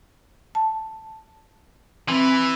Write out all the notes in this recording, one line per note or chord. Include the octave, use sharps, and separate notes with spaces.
A5
E3 C4 E4